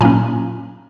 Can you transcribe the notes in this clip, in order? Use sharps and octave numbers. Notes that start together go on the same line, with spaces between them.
A#2 F#3 A#3 C#4 G#5 A#5